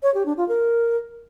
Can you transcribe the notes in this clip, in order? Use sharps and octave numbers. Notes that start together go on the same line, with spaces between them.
C#5
G4
D4
F4
A#4